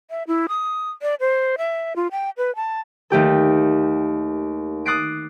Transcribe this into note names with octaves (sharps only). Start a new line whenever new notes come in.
E5
E4
D#6
D5
C5
E5
F4
G5
B4
A5
D#2 A3 G4 A4
D6 D#6 F#6 A6 C7 D7